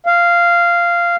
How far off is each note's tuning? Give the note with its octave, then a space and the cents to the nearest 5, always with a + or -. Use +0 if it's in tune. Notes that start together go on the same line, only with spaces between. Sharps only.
F5 -10